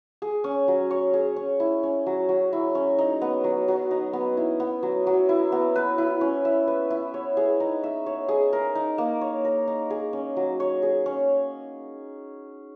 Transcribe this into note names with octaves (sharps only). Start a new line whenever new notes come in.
G#4
C#4
F#3
C#5
G#4
C#4
E4
C#4
F#3
F#3
E4
C#4
D#4
B3
F#3
F#3
D#4
B3
E4
B3
F#3
F#3
E4
B3
B4
E4
C#4
E5
B4
E4
C#5
G#4
D#4
E5
C#5
G#4
A#4
D#4
A#3
C#5
A#4
D#4
G#4
C#4
F#3
C#5
G#4
C#4